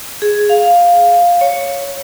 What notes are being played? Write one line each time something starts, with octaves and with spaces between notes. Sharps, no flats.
G#4
F5
C#5